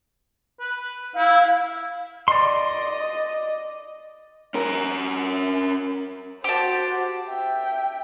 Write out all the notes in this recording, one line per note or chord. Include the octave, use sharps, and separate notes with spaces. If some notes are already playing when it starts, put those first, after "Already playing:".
B4
E4 F5
D5 D#5 C6
C#4 A#4
F#4 G4 C5 A5
E5 G5